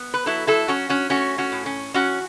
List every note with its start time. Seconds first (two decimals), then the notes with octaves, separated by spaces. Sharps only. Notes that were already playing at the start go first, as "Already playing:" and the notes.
Already playing: B3
0.14 B4
0.26 F#3 E4 A4
0.47 E4 A4
0.68 F#3 C#4 F#4
0.89 C#4 F#4
1.10 A3 C#4 F#4
1.38 C#4 F#4
1.52 A2
1.66 C#4
1.94 E3 C#4 F#4